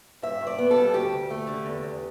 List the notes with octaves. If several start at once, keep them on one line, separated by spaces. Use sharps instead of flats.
G2 E5
G2
D5
B3
A4
G3
D2 G4
D2
A3
D3
E2
E2